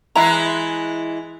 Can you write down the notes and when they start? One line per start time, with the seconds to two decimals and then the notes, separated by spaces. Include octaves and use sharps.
0.16 E3 G#3 E4 A#5